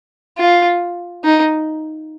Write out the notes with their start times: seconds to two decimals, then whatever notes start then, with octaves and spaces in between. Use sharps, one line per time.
0.38 F4
1.24 D#4